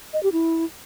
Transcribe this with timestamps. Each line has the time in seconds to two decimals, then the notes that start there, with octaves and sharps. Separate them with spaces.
0.13 D#5
0.23 G4
0.33 E4